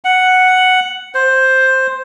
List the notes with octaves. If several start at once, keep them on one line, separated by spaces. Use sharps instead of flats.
F#5
C5